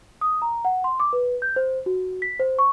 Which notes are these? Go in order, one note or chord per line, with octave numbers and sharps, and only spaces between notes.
D#6
A#5
F#5
C6
D6
B4
G6
C5
F#4
B6
C5
C#6